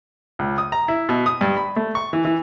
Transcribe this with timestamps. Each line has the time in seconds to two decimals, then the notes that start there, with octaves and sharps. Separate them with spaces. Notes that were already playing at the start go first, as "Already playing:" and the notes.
0.39 C#2
0.58 D#6
0.72 A#5
0.88 E4
1.09 B2
1.26 D#6
1.41 G2
1.57 B5
1.76 A3
1.95 C#6
2.13 E3
2.25 E3